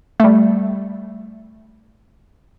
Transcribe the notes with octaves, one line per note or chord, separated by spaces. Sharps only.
G3 A3